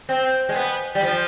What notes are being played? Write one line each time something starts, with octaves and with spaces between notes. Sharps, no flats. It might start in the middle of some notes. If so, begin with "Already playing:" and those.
C4
G#3
B3
G3
F3